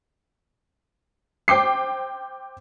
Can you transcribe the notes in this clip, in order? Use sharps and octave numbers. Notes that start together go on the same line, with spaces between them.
C5 G5 D6 C7